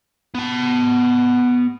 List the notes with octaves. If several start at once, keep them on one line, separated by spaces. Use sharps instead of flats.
B3 A5